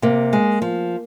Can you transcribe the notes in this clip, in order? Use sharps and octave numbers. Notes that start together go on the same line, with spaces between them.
C3 A#3
G#3
F3